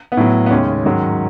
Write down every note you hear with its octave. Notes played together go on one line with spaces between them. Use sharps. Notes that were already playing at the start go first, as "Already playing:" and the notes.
B3
A2 F#3
B3
D#2 C#3 G#3 C#4
G#2 D#3 F#3